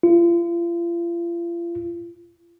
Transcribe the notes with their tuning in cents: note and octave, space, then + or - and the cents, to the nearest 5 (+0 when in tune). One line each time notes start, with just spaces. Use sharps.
F4 -40